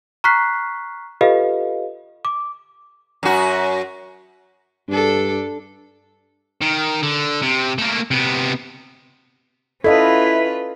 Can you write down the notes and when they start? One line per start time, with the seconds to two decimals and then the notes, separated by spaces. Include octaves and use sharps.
0.24 A#5 C#6 F6 F#6 B6 C7
1.21 F4 G4 A4 B4 D#5 F5
2.25 D6
3.23 F#2 F#4
4.89 G2 D4 A4
6.61 D#3
7.02 D3
7.42 C3
7.78 A3 A#3
8.11 C3 B3
9.84 C#4 E4 F4 A4 B4 D#5 F5